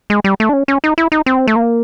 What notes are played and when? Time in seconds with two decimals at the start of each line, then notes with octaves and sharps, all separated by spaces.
0.10 G#3
0.24 G3
0.40 A3
0.49 D4
0.53 C#4
0.68 C#4
0.84 D#4
0.98 E4
1.12 D#4
1.26 C4
1.47 A3
1.56 A#3